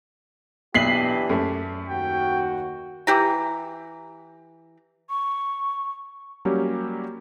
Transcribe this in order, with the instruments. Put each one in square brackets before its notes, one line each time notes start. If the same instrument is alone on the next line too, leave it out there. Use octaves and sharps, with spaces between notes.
[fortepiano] B1 [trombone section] E3 D4 G4 [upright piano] B6 C7 F#7
[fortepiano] F#2 A3
[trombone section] D#2 F#4 [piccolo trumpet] G5
[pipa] E3 G4 A#5
[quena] C#6
[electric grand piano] F#3 G3 A#3 C#4 G4